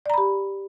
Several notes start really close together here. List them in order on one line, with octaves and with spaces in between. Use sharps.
D5 A#5 B5 G4